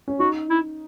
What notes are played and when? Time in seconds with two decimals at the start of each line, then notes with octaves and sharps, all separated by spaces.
0.08 C#4
0.20 D#4 F#4
0.50 E4